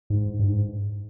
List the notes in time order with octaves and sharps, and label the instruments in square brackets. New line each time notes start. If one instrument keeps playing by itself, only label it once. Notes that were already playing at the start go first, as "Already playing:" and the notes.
[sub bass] G#2
G2
G#2